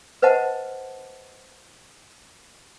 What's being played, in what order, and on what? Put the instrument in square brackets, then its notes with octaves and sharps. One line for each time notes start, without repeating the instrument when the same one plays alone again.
[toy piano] B4 C5 D#5 F#5 A5